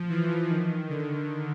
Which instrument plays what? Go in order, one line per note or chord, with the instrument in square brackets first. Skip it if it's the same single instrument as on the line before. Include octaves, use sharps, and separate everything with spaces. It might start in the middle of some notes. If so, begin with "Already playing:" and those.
Already playing: [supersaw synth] F3
E3
D#3
D3